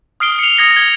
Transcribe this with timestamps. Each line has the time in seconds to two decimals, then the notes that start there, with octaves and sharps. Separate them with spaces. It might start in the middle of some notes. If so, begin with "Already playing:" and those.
0.20 D#6 F6 C7 D7 G7
0.39 C#7 F7
0.57 D#6 G#6 A#6 C#7 G7
0.76 G#6 G7